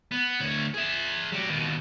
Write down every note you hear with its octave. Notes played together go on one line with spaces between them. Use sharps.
B3
D2 C#5
G#4 E5
F#3 G4
D#2 B2